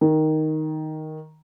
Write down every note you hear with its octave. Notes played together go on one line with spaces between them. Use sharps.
D#3